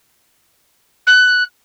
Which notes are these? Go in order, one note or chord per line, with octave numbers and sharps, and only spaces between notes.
F#6